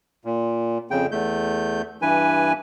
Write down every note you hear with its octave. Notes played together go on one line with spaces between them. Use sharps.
A#2
F2 C#3 G5
E2 A3 G6
G2 E3 B4 G#5